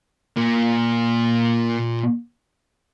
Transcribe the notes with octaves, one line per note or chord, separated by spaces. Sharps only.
A#2 A#3